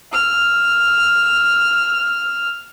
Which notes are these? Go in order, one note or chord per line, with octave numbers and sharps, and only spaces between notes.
E6 F6